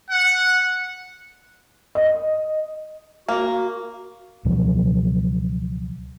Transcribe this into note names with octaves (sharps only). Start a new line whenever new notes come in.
F#5
D#5
A#3 F#4
C#2 B2 F3 F#3